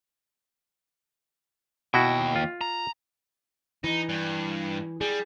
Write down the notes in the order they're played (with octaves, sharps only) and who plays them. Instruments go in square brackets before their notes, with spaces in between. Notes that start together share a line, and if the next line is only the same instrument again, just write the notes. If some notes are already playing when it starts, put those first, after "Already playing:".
[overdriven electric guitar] D#2 G5 [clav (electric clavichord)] B2 E4 F#4
[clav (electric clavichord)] F4
[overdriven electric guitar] A#5
[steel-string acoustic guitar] E3 [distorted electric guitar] D#4
[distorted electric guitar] G2
[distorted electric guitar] G3 [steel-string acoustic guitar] G#4